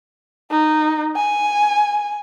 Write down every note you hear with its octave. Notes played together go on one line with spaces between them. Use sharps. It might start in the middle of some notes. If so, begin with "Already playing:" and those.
D#4
G#5